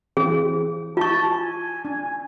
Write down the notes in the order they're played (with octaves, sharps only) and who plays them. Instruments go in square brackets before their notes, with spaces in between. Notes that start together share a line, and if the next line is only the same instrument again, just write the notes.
[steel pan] E3 C4 [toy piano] G#4
[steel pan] E4 [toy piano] F4 C#6 [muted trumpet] A5
[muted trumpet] G#5
[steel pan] D4